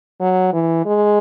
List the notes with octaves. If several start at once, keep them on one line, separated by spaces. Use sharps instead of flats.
F#3
E3
G#3